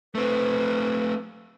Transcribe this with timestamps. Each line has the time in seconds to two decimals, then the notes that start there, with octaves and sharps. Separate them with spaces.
0.15 A3 C4 B4